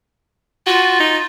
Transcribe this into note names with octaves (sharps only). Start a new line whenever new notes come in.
F4 F#4
D#4